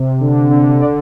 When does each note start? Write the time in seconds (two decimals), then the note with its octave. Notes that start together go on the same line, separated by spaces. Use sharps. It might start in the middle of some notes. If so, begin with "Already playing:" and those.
Already playing: C3
0.20 D3
0.51 D3
0.80 D3 D5